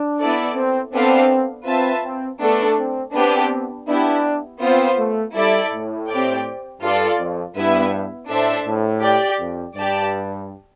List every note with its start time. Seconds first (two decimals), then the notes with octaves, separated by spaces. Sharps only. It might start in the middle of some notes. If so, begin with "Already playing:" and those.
Already playing: D4
0.20 B3 E4 A4 D5
0.56 C4
0.93 B3 C4 D4 A4 C5 F5
1.66 C4 F4 B4 E5 A5
2.03 C4
2.40 A3 B3 D4 A4
2.77 C4
3.14 B3 C4 D4 G4 B4
3.87 B3 D4 E4 G4
4.61 B3 C4 F4 C5
4.98 A3
5.35 G3 E4 A4 D5
5.72 A2
6.08 C4 G4 D5 G5
6.81 G2 F4 A4 D5
7.18 F2
7.55 G2 B3 E4 B4 E5
8.29 A2 D4 A4 C5 E5 A5
8.66 A2
9.02 G4 D5 G5
9.39 F2
9.76 G2 G4 D5 A5